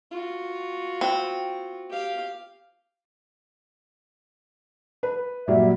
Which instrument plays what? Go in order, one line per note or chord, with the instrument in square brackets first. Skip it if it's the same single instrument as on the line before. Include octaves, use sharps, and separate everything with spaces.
[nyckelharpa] F4 F#4
[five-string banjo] C4
[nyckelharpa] G4 F5
[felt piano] B4
[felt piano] A#2 F#3 G3 [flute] E5